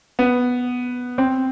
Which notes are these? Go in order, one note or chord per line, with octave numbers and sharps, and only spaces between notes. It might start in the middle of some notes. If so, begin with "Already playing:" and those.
B3
C4